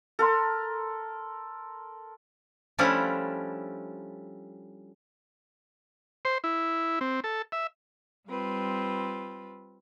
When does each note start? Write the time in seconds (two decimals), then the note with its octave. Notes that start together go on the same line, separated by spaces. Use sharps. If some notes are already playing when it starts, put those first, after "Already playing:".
0.19 A4 A#4 C6
2.79 F3 G3 A3 C#4 D4 E4
6.25 C5
6.44 E4
7.01 C4
7.24 A4
7.52 E5
8.28 G3 C4 F4 B4